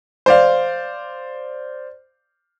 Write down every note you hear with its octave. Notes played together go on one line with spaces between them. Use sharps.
C5 D5 F5